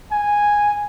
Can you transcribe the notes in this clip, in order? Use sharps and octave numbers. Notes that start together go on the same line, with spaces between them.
G#5